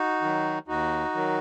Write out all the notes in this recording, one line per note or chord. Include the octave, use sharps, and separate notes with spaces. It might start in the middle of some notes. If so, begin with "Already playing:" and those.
Already playing: D#4 F#4
D#3 F#3
D#2 D#4 F#4
D#3 F#3